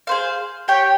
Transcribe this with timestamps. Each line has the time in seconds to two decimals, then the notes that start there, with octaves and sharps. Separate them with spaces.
0.07 G#4 C5 F5
0.68 G4 C#5 G5